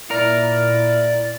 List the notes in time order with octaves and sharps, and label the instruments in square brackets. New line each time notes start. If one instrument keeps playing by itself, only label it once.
[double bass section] A#2 [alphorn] E4 [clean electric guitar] A#4 [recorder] D5